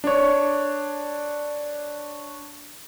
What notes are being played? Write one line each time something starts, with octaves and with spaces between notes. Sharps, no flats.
D4 C#5